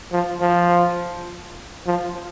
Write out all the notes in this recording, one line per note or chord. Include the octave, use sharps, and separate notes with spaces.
F3
F3
F3